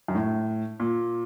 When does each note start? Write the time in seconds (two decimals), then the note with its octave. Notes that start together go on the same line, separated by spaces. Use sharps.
0.08 F#2
0.15 A2
0.80 A#2